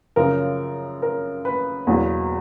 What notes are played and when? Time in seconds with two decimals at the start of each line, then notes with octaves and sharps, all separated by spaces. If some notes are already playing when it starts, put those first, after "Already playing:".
0.16 F#2 C#3 F3 A#4
1.02 A#4
1.45 B4
1.87 E2 B2 F#3 A#3